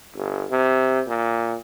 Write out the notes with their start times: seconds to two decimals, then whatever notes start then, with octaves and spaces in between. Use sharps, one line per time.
0.16 G1
0.50 C3
1.07 A#2